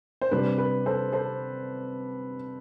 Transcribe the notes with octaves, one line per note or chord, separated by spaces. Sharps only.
C5
C3 G3 D4 B4
B4
A4 C5
A4 C5